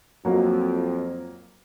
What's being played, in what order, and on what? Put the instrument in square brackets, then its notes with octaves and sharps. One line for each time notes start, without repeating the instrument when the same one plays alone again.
[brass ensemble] F2 [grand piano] F#3 A#3